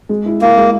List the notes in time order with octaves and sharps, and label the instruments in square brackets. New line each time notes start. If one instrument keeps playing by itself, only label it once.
[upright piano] G#3
E4
[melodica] A#3 [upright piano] E4
[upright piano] G#3